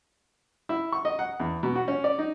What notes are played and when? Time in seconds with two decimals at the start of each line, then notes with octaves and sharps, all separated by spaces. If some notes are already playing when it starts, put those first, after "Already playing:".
0.69 E4
0.92 C#6
1.05 D#5
1.19 F#5
1.40 E2
1.63 B2
1.76 F#4
1.88 C#4
2.04 D5
2.19 D#4